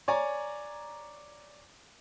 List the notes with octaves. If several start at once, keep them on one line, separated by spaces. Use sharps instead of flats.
C#5 D5 G#5 A#5